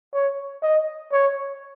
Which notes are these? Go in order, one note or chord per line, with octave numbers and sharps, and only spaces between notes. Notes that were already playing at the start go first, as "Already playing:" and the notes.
C#5
D#5
C#5